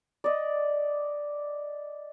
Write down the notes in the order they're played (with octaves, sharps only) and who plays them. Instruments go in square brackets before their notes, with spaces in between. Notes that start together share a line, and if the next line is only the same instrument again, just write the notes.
[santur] D5 D#5